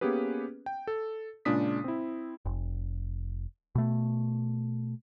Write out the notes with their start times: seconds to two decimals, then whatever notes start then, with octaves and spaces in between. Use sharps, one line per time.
0.01 A#3 B3 C#4 G4 G#4 B4
0.66 G5
0.87 A4
1.45 A#2 C#3 G#3 D4 D#6 B6
1.84 C4 E4
2.46 F1
3.75 B2 A3